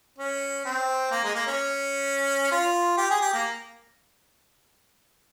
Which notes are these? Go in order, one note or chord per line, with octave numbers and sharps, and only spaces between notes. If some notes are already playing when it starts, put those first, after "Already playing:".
C#4
C4
A#3
G#3
A#3
C#4
F4
G4
G#4
G4
A#3